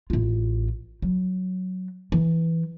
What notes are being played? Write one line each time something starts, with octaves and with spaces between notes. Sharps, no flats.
A1 F4
F#3
E3